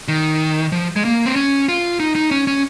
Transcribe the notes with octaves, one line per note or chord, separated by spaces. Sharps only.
D#3
F3
G#3
A#3
C4
C#4
F4
D#4
D#4
C#4
C#4